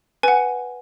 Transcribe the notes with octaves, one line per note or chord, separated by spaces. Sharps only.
B4 F#5 G#5